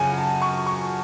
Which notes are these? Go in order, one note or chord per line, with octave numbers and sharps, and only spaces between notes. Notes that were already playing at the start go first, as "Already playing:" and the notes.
Already playing: F#2 C#3 F#3 F#5 G#5
A5
C#6
C#6